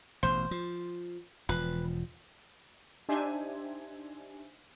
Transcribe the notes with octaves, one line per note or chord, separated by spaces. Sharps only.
A1 B2 C5
F3
E1 F3 B4
D4 D#4 G4 C5 E5 G#5